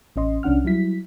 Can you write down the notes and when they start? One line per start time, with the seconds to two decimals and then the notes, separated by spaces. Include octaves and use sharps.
0.16 A1 C#4 D#5 C6
0.43 C2 C#4 D4 F#5 F6
0.65 F#3 G3 E4 B6